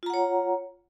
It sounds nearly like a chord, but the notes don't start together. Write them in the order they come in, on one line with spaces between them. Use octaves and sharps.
F4 A#5 F#5 C#5